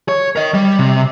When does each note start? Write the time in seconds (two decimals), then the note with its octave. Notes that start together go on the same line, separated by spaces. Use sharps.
0.08 C#5
0.36 A#4 D#5
0.54 G3
0.79 C3